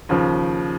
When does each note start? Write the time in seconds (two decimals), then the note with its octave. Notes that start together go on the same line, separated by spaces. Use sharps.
0.09 D#2 C#3 F3